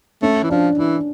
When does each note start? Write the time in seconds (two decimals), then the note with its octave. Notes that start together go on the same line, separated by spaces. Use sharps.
0.22 A3 C#4
0.43 E3
0.50 F3 D4
0.78 E3 D4